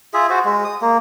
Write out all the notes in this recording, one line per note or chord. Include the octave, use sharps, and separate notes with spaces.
F4 G#4 E5
F#4 C5
G#3
D#6
A#3